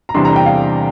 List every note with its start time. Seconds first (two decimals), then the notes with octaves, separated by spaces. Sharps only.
0.09 A#5
0.14 E2 C3 G3 D4 C6
0.25 A#5
0.36 G5
0.46 F5